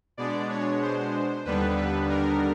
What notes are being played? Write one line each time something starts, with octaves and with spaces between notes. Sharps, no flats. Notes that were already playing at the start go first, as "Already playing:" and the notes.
B2 G#3 B3 D4 D5
C#5
C5
D#2 D3 G3 B3 D4 B4
B4
A#4